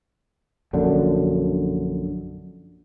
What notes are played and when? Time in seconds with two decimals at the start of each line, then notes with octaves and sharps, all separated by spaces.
0.73 A#1 F#2 D3